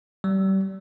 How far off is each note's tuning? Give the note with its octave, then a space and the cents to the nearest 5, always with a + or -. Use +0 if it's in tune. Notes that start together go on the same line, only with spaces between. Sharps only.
G3 -30